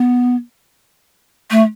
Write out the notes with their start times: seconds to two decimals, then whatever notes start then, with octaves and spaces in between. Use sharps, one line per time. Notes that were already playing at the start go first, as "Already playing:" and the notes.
Already playing: B3
1.51 A3